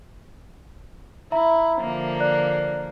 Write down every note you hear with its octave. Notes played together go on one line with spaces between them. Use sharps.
E4 E5 A#5
D3 F3 A#3
D5 F#6